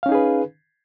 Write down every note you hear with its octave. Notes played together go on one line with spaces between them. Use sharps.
C#4 D#4 G#4 B4 F5